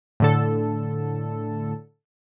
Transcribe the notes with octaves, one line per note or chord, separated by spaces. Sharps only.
A2 D3 A4